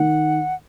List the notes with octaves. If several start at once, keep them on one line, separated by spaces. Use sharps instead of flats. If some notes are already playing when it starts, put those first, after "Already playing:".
Already playing: D#3 F#5